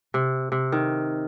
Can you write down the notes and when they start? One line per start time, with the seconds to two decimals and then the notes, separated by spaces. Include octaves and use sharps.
0.14 C3
0.52 C3
0.72 D#3